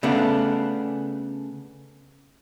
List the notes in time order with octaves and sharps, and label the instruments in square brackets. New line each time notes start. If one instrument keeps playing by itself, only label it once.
[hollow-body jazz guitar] C#3 A3 B3 D4